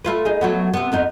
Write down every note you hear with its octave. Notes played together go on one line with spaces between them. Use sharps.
A3 F4 B4
D#4 G#4
F#3 A3 B3
C3 B3
F2 B3 D#4